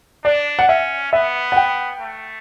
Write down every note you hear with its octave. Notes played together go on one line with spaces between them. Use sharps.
D4 D5
F#5
C#4 E5
B3 E5
F#5
G5
A3